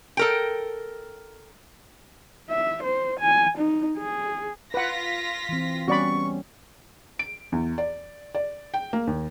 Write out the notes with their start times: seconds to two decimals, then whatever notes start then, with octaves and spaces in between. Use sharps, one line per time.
0.17 A4 A#4 G5
2.50 E5
2.83 C5
3.20 G#5
3.58 D#4
3.98 G#4
4.74 F4 B4 F#5 A#6 B6
5.49 E3 C4
5.88 G3 B3 C#4 F#4 D5 B5 C#6
7.19 D7
7.52 E2
7.78 D5
8.35 D5
8.74 G5
8.93 A#3
9.07 D#2